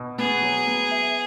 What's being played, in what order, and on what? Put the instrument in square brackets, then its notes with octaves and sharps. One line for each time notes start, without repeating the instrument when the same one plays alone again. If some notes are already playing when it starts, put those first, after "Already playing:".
Already playing: [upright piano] B2
[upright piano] B3 [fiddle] G#4
[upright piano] F#3
B3
E5